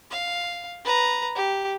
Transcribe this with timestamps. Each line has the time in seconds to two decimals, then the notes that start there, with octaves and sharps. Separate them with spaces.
0.11 F5
0.85 B4 A#5
1.36 G4